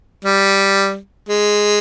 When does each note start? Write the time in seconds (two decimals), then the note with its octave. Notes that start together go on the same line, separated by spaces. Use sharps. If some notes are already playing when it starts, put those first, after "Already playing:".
0.24 G3
1.29 G#3